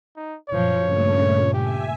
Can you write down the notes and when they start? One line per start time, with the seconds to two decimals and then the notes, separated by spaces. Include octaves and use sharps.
0.16 D#4
0.50 F#2 A#2 F3 C#5
0.81 G2 A#2 C#3 A3
1.54 G4 E5 G#5